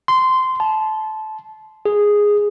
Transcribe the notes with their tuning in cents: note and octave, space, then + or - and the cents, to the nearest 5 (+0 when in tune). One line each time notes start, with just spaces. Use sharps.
C6 -15
A5 -20
G#4 -5